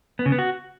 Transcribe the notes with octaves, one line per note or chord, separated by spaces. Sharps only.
B3
C#3
B3
F#4